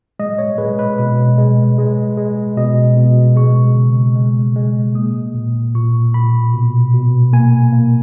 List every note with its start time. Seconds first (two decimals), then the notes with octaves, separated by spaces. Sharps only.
0.19 G#3 D#5
0.39 C#5
0.58 G#3 B4
0.79 B4
0.98 B2 B4
1.38 G#3
1.78 G#3
2.17 G#3
2.57 B2 D#5
2.97 B2
3.36 G#3 C#6
3.76 C#3
4.15 G#3
4.56 G#3
4.95 A#3 D#6
5.34 A#2
5.75 A#2 C#6
6.14 A#2 B5
6.53 B2
6.94 B2
7.33 A#3 G#5
7.73 A#3